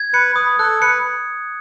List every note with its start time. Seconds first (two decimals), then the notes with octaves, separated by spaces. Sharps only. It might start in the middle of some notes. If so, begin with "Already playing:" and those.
Already playing: G#6
0.13 B4 C#7
0.36 B4 D#6
0.59 A4 F#6
0.81 B4 C#7